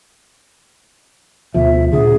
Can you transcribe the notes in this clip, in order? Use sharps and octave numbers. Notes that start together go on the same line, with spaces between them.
D2 B2 F3 E5
A#2 D3 F3 G#4